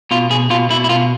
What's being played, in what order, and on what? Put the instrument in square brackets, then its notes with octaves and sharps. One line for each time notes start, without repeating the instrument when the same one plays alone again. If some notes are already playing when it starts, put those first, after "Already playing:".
[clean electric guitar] B2 F4
B2 G#4
B2 F4
B2 E4
E4
B2 F4